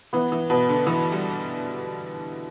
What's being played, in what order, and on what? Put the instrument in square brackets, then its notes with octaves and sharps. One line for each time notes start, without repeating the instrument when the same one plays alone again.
[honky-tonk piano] E3 [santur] B3
[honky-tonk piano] E3
[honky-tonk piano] B2 [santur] B3
[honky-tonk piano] D3
[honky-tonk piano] E3 [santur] B3
[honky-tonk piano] G3